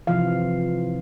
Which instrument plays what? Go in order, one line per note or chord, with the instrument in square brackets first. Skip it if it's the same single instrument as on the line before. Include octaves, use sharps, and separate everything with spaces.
[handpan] C3 E3 F3 F4 F5